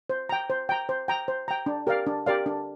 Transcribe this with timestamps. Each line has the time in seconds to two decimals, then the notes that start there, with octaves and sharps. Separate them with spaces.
0.10 C5
0.29 G5 A#5
0.50 C5
0.69 G5 A#5
0.89 C5
1.08 G5 A#5
1.28 C5
1.48 G5 A#5
1.66 D4
1.87 G4 A#4 D5 F5
2.07 D4
2.26 G4 A#4 D5 F5
2.46 D4